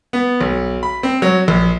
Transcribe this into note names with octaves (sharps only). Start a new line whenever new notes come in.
B3
B1
B5
C4
F#3
A#1